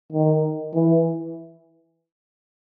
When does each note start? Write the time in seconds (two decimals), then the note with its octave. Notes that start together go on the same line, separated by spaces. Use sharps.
0.12 D#3
0.75 E3